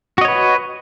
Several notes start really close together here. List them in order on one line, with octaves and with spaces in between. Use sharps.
F#4 D#5 C#5 B4